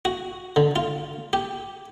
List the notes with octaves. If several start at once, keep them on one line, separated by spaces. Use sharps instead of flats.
F#4
D3
F4
G4